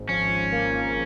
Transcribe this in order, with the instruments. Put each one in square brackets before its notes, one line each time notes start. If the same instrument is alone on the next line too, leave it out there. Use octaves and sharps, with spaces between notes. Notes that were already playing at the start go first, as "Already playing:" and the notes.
Already playing: [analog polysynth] G#1 G#2
[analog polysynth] F3 [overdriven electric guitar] C#4
[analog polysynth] A#3